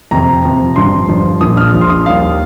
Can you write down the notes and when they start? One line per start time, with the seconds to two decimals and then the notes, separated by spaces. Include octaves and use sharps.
0.11 F2 C3 F3 A#5
0.44 F2 C3 F3
0.76 G1 G2 F3 C6
1.08 G1 G2 F3
1.41 A#1 A#2 F3 D#6
1.57 F6
1.73 A#1 A#2 F3
1.81 C6
1.89 D#6
2.06 D#2 D#3 G3 F5